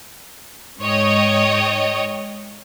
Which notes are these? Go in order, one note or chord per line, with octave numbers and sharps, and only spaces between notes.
G#2 C#5 D#5 G5